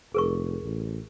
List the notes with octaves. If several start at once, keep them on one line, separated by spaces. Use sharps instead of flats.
F1 G#4 A#4 C#6
A1